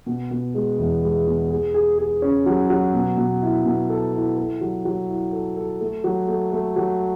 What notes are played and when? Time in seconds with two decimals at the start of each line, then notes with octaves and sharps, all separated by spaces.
0.06 B2
0.31 B2
0.54 G#3
0.78 E2
1.03 G#3
1.27 B2
1.50 G#4
1.74 G#4
1.99 G#4
2.22 C#4
2.46 F#3
2.70 F#3
2.94 B2
3.17 B2
3.42 E4
3.66 B2
3.90 A4
4.13 E4
4.37 A4
4.61 F#3
4.85 F#3
5.09 E4
5.32 A4
5.57 A4
5.81 A3
6.04 F#3
6.28 A3
6.52 A3
6.76 F#3